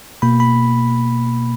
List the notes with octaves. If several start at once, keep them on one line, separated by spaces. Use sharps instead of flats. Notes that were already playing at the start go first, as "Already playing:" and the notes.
B2 A#3 B5
B5